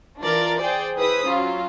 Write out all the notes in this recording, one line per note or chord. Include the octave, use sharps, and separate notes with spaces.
E3 D4 F4 A#4 D5
G#4 C5 D5 G5
E4 G#4 B4 C5 B5 D#6
F#3 C#4 F4